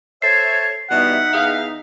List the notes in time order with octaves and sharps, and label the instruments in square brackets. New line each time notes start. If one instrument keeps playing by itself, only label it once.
[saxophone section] A4 C5 E5 [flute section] C#5 [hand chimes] C7
[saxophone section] B2 E3 G3 [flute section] D#4 E5 [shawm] F#5
[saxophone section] E2 G#4 F5